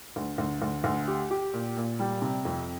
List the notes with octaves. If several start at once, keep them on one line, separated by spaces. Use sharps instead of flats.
D2
D2
D2
D2
G4
G4
A#2
A#2
G3
C3
F2